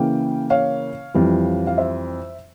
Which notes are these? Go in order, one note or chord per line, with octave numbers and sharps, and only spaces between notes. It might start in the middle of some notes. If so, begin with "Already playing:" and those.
Already playing: C#3 E3 A#3 C#4 G5
C#5 F5
F2 E3 G3
F5
C5 E5